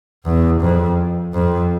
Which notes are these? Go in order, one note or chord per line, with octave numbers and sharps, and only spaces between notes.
E2
F2
F2